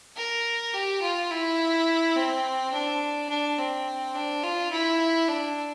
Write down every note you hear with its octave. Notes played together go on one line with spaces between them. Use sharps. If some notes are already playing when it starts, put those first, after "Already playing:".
A#4
G4
F4
E4
C4
D4
D4
C4
D4
F4
E4
D4